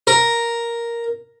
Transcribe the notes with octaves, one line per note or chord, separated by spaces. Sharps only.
A#4